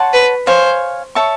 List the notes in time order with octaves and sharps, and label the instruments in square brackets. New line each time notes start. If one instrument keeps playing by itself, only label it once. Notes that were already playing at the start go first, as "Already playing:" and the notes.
Already playing: [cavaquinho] C#5 F#5 A5 C6
[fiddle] B4
[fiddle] C5 [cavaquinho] C#5 F5 G#5
[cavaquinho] C#5 E5 A5 C#6